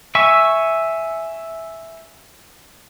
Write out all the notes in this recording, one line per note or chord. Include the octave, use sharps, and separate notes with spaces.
E5 G#5 C#6 E6